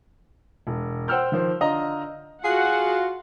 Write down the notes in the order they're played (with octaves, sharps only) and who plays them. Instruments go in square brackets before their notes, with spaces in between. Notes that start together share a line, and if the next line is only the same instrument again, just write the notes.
[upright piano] E1
C5 F#5 G5 E6 F6 G6
D#3 F3 C5
D3 F4 D#5 A#5
[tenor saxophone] F4 [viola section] F#4 F#5 [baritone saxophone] G#4